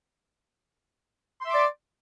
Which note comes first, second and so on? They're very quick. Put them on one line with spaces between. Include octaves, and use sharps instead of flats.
C6 E5 D6 D5